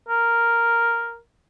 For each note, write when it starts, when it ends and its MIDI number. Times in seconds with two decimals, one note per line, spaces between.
0.09 1.18 70